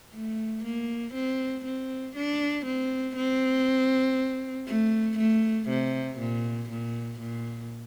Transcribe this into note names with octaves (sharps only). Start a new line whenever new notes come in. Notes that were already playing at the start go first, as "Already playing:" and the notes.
A3
A#3
C4
C4
D4
C4
C4
A3
A3
C3
A#2
A#2
A#2